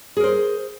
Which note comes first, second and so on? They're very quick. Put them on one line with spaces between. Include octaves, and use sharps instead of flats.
G#4 A#4 C5